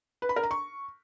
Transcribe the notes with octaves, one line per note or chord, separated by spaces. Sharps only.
B4
B5
A#4
A#5
C#6